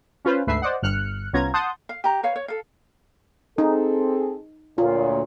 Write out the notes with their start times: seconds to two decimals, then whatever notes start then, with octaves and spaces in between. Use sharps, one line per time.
0.25 C#4 F4 B4 C5
0.47 D2 G#2 A3 B4 E5 C7
0.62 C5 D5 D#5 F#5
0.82 G1 G2 F6 F#6 C#7
1.33 C2 B3 C#4 F4 A#5 G#6
1.54 F#5 A5 C6 D#6 G6
1.89 F5
2.04 G4 A#5
2.23 B4 C#5 F5
2.36 C#5
2.48 A4 F5
3.58 C4 D#4 G#4 A4
4.78 D2 A#2 F4 C#5